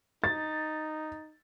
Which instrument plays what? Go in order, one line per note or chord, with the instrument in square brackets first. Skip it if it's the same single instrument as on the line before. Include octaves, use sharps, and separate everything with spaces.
[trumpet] D#4 [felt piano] A6